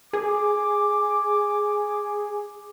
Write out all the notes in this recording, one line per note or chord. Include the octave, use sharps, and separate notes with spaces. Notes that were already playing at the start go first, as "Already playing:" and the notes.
G#4 D6